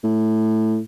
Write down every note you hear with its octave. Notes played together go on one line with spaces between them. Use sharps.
A2